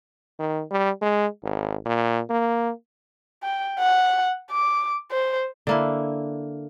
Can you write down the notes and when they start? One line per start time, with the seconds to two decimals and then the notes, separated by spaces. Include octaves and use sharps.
0.39 D#3
0.71 G3
1.01 G#3
1.43 G#1
1.85 A#2
2.30 A#3
3.43 G5
3.79 F#5
4.51 D6
5.11 C5
5.67 D3 A#3 E4